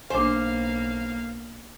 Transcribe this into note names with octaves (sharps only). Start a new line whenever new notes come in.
B1 A#3 D4 C5 F5 G#5